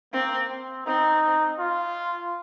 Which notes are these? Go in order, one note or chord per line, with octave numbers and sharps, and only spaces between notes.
A#3 C4
C4
C4 D#4
F4